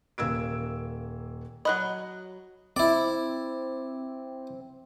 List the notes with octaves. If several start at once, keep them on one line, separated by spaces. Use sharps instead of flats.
D#1 A#3 E6 G#6 D7
F#3 C#4 D#5 B5 F#6
C4 E4 D5